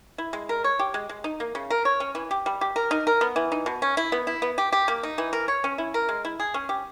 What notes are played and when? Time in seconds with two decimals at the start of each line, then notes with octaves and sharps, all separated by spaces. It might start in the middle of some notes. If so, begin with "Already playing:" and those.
0.18 E4
0.33 G#3
0.49 A#4
0.64 C#5
0.79 G4
0.94 G#3
1.09 G#3
1.24 D#4
1.40 A#3
1.55 C#3
1.70 A#4
1.85 C#5
2.00 C#4
2.15 E3
2.31 G4
2.46 G3
2.61 G4
2.76 A#4
2.91 D#4
3.07 A#4
3.21 B3
3.36 E3
3.52 D#4
3.66 B2
3.82 C#4
3.97 E4
4.12 B3
4.27 E4
4.42 B3
4.58 G4
4.72 G4
4.88 A#3
5.03 D#4
5.18 E3
5.33 A#4
5.48 C#5
5.64 C#4
5.78 E4
5.94 A#4
6.09 G#3
6.25 E4
6.40 G#4
6.54 C#4
6.69 G4